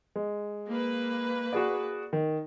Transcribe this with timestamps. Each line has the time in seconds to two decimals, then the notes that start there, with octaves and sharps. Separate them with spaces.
0.16 G#3
0.69 A#3 B4
1.53 F#4 G#4 D5
2.13 D#3